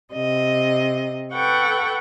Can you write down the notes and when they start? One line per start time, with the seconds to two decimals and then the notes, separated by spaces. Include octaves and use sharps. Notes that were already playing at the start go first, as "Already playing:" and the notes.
0.13 C3 D#5
1.33 A4 B4 F#5 G5 C#6